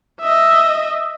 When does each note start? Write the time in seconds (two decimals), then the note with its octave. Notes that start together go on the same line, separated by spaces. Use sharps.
0.21 D#5 E5